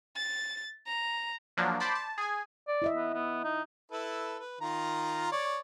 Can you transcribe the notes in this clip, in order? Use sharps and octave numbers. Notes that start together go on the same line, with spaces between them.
A6
A#5
F3 F#3 A#3 D4
C5 D5 A5 B5
A5
G#4 G#5
D5
E4 D#5 E5
B3
B3
D#4
E4 A4 B4
B4
D#3 F4 A#5
C#5 D5